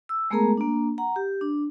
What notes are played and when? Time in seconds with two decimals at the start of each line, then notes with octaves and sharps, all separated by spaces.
0.09 E6
0.30 G#3 A3 B3 G#4 A#4 A#5
0.57 A#3 D4
0.98 F#5 A#5
1.16 G4
1.41 D4